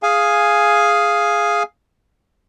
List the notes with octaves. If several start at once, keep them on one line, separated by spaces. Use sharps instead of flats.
G#4 F5 G#5